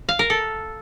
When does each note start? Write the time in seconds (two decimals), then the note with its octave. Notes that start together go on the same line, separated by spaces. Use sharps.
0.09 F5
0.19 A#4
0.30 A4